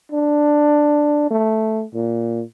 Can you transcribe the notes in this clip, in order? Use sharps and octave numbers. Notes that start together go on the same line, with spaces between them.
D4
A3
A#2